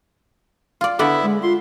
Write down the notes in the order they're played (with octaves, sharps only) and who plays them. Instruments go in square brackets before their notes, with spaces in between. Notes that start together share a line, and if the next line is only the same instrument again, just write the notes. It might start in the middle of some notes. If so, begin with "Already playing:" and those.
[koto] F4 D5
[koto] D3 D5 F#5 [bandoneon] B3 E4 E5
[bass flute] G#3
[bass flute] F4 [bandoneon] C6